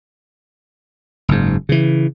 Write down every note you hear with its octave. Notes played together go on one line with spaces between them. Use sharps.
F#1 G#2
C#3 E3